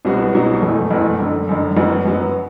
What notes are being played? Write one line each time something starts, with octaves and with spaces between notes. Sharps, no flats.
C2 B2 F#3 B3 F#4
C2 B2 F#3 B3 F#4
F#1 E2 B2 A3
F#1 E2 B2 A3
F#1 F#2 D3
F#1 F#2 D3
F#1 F#2 F#3 B3 F#4
F#1 F#2 F#3 B3 F#4